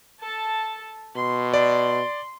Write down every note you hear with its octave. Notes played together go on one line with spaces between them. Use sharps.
A4 A5
B2 C6
D5 C6